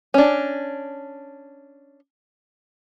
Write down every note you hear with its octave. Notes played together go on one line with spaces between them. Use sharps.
C#4 D4